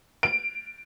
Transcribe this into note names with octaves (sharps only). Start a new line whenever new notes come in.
D7